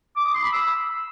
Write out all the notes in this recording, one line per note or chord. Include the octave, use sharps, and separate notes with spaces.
D6
D#6
C6
B5
E6